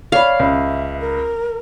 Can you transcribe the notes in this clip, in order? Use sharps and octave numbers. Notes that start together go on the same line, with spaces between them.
C#5 D5 F5 B5
C#2 E5
A#4